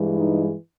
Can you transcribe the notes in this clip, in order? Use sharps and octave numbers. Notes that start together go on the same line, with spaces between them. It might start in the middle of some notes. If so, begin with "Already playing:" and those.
Already playing: G2 E3 G#3
D#4